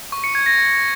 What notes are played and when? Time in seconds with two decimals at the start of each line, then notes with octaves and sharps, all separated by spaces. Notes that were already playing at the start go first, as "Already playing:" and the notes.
0.12 C#6
0.24 C#7
0.35 G#6
0.46 A#6